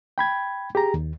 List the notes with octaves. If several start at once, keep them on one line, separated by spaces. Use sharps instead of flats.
G5 B5 G#6
G4 G#4 A#5
D#2